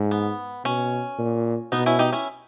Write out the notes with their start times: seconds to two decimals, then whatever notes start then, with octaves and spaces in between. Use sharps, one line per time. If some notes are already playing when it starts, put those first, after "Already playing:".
Already playing: G#2
0.11 B3
0.65 B2 C#4
1.18 A#2
1.72 B2 B3 D#4
1.86 C#4 E4
1.99 D#4 G4
2.13 C#4 E4